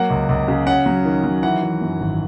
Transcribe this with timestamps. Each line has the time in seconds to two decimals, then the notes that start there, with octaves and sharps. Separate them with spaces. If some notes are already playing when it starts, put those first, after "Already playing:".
Already playing: F#3 A#3 F#5
0.10 C#2
0.29 C#2
0.48 C#3
0.66 C#4 F#5
0.86 F#3
1.05 D#3
1.24 F#3
1.43 E3 F#5
1.63 E3
1.81 F#2
2.00 G#1